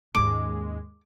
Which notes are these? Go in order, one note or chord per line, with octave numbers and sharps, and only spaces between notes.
D#2 G#2 G#3 C#4 D6